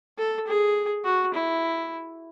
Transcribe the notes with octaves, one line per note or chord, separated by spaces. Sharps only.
A4
G#4
F#4
E4